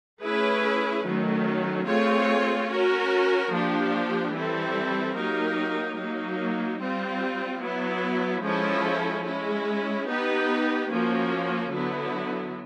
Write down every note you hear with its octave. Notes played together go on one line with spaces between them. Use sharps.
A3 C#4 E4 G#4 B4
D#3 F#3 A3 C#4
A3 C4 F4 G#4 C#5
C#4 F#4 A#4
F3 A#3 D4 G4
E3 G3 C4 E4 A4
F#3 A#3 D#4 G4 A#4
F#3 A#3 D#4
G3 C4 F4
F#3 B3 E4
F3 G#3 C#4 E4 A4
G#3 C#4 E4
B3 D#4 G4 B4
F3 A#3 C#4 F#4
D3 F#3 B3 E4